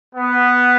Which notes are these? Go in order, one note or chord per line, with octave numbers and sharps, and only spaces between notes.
B3